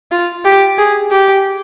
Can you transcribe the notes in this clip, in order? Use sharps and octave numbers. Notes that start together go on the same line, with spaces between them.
F4
G4
G#4
G4